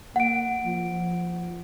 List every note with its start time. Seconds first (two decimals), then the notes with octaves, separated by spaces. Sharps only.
0.16 A#3 F#5 D7
0.66 F3